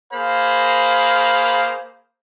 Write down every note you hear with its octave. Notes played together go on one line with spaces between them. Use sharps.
A#3 G#4 A#4 C5 F5 B5